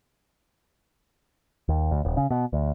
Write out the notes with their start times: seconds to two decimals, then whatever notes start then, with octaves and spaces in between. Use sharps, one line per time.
1.68 D#2
1.91 D2
2.05 D#1
2.17 C#3
2.31 B2
2.53 D2